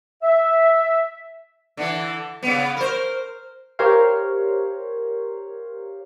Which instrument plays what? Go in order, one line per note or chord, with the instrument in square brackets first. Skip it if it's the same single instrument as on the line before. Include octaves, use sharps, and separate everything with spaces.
[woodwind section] E5
[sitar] D3 E3
C#3 B3
A#4 C5
[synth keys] G4 A#4 C5 C#5 F5